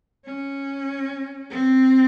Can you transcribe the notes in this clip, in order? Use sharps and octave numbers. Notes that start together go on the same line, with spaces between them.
C#4
C4